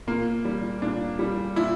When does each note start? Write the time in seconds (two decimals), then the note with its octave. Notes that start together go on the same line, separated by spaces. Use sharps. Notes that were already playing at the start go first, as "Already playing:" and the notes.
0.07 A#2 A#3
0.45 G3
0.82 A#2 D4
1.19 G3
1.56 A#2 E4